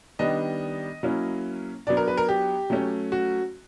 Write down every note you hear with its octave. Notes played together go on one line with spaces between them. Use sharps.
D#3 G3 B3 D4 D#5
F#3 A#3 C#4 E4
F#3 B3 D4 D5
A#4
B4
A#4
G4
F#3 A3 C#4
F#4